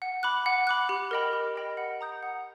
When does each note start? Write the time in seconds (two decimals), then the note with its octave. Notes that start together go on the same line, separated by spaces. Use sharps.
0.02 F#5
0.23 B5 D6 F#6
0.46 F#5
0.67 B5 D6 F#6
0.89 G4
1.11 A#4 D#5 G5 B5
1.33 G4
1.56 A#4 D#5 G5 B5
1.77 F#5
2.01 A#5 D#6 G6
2.23 F#5